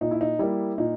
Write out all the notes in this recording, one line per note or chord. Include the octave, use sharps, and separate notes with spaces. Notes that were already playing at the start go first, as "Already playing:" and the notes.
A#2 D#4
E4
D#4
G3 A#3 E4
A#2 D#4